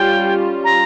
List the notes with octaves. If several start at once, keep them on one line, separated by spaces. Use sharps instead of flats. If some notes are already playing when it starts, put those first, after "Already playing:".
Already playing: G3 C#4 F4 G5
A#5